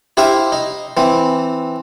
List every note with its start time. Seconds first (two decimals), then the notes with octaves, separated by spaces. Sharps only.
0.17 E4 G4 C5 E5 F5
0.52 D#4
0.97 E3 C4